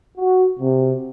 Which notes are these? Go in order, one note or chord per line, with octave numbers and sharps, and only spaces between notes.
F#4
C3